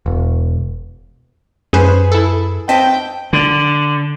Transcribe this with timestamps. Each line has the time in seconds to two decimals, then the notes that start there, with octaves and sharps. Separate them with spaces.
0.06 E1
1.73 F#2 C#4 G#4 B4 C5
2.12 E4 A4
2.69 C4 D#5 G5 A5 B6
3.33 D3